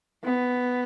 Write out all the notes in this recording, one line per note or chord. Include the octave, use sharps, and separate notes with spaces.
B3